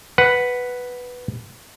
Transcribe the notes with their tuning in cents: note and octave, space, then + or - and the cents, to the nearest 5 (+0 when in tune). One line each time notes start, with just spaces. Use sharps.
B4 +0 F#5 +0